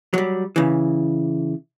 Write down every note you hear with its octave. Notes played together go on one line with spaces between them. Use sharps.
F#3 G3
C#3 E3